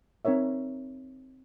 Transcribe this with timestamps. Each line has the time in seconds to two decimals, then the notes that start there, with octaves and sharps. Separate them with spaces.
0.25 C4 D#4 A#4 C#5 E5